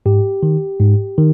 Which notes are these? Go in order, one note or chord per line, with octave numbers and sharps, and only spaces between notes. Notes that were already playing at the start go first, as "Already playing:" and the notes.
G#2 G4
D#3
G#2
D#3